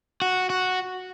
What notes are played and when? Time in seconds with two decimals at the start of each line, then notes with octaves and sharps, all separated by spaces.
0.22 F#4
0.50 F#4